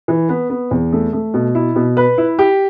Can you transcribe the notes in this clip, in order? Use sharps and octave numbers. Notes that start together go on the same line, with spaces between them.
E3
B3
B3
E2
A3
A3
B2
E4
B2
B4
E4
G4